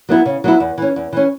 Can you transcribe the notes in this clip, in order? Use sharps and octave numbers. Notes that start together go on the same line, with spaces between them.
F#3 B3 E4
C#3
F#3 B3 E4
E2
E3 C#4
E2
E3 C#4